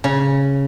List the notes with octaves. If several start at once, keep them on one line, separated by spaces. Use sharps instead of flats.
C#3